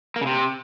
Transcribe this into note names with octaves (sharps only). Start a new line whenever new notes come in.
A#3
C#3
C3